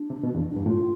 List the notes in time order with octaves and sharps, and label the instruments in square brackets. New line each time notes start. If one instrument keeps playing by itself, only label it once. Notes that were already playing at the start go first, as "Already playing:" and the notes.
Already playing: [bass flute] D4
[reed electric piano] C3
B2
E2
[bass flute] D4
[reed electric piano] G2
[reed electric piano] A2 [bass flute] F4